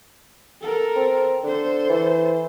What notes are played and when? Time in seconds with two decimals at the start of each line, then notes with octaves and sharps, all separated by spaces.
0.61 A4 A#4
0.96 C4
1.44 D3 A4 C5
1.89 E3